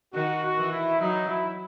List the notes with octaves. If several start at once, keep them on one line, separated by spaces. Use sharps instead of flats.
D#3 F#4
F#4
E3
E4
F#3 D#4
E4